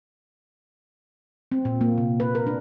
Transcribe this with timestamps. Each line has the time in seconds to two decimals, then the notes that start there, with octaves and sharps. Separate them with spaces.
1.52 C4
1.65 A#2
1.81 A#3
1.98 C3
2.20 B4
2.35 A#4
2.47 D4